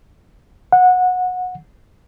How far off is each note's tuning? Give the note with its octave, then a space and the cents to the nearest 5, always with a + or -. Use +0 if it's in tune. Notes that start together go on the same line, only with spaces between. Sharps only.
F#5 -20